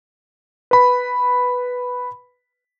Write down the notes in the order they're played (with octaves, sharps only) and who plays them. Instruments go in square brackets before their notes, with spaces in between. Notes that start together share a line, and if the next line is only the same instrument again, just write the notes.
[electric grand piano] B4 B5